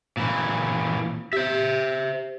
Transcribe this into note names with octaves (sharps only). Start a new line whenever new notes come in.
A#2 E3
G4 C5 E5